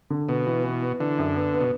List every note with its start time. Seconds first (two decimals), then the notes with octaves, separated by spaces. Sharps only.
0.10 D3
0.29 B2 B3
0.47 E3
0.64 E3
0.82 B3
1.00 D3 E3
1.18 F#2
1.36 B3
1.53 B3
1.61 B2